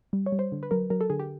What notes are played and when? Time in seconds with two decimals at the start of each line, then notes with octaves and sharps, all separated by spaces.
0.13 G3
0.26 C#5
0.32 G3
0.39 C5
0.52 D3
0.63 B4
0.71 F#3 A#4
0.90 F#3 A#4
1.01 A4
1.10 D3 G#4
1.20 G4